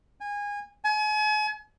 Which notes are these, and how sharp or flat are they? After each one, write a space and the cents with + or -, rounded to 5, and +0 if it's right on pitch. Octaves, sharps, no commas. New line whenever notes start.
G#5 -25
G#5 +40